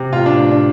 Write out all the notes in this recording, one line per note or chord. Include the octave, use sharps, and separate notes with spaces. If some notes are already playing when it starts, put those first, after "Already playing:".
Already playing: C3
A1 F4
D4
A1
D4